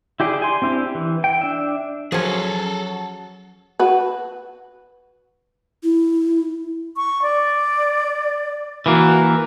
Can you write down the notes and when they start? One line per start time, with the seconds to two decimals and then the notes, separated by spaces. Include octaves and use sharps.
0.20 E4 G4 G#4 D5
0.42 G#5 C6
0.62 C4 D4 E4 G4
0.95 E3
1.24 G5
1.41 D4 E5
2.12 F3 F#3 C#4 G#4 A4
3.79 F#4 B4
5.83 E4
6.97 C#6
7.22 D5
8.86 E3 A#3 F#4